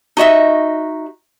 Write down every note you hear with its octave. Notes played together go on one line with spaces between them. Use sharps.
D#4 F#4 D#5 E5